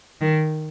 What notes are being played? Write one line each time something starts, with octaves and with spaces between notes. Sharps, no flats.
D#3